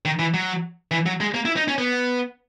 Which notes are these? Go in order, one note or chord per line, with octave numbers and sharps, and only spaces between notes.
D#3
E3
F#3
E3
F#3
G#3
A#3
E4
D#4
C#4
B3